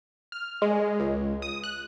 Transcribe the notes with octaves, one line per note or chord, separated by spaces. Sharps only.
F6
G#3
C#2
D#6
F#6